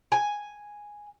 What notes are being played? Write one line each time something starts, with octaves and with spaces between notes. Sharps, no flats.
G#5